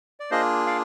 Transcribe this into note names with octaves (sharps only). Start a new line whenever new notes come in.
D5
A#3 D4 F4 G#4 C5 D#5
D5 F5